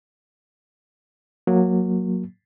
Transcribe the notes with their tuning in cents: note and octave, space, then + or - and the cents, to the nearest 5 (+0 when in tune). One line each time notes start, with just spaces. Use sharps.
F#3 -15 A#3 +0